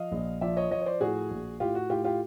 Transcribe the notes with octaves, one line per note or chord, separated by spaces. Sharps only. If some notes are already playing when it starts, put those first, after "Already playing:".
Already playing: F3 D#5 F5
A#1
F3 D5 E5
C#5 D#5
F3 C#5 D#5
C#5
C5 D5
A2 F#4 G#4
A#1
A2 F4 G4
F#4
A2 F4 G4
F4 G4